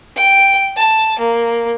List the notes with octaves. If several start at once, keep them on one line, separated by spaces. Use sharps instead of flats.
G5
A5
A#3